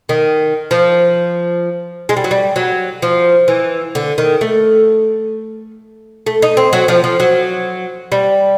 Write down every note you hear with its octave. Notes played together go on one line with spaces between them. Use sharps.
D#3
F3
G#3
G3
F#3
G3
F#3
F3
E3
D3
D#3
A3
A3
D#4
C4
F#3
F3
F3
F#3
G3